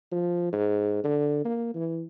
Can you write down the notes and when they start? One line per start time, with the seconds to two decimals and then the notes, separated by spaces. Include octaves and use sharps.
0.12 F3
0.53 G#2
1.04 D3
1.45 A#3
1.75 E3